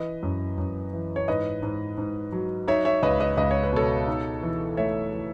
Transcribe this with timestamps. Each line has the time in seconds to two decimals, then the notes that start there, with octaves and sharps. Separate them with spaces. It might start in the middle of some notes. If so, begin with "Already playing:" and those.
Already playing: E3 B4 D#5
0.23 F#2
0.58 F#2
0.93 E3
1.16 C#5
1.28 G#2 B4 D#5
1.62 G#2
1.98 G#2
2.32 F#3
2.68 D#4 C#5 E5
2.85 C#5 E5
3.03 C#2 B4 D#5
3.20 B4 D#5
3.37 C#2 D#5
3.51 C#5
3.63 B4
3.73 B2 A4 C#5
4.07 D#4
4.43 E3
4.77 A3 C#5 E5
5.12 E3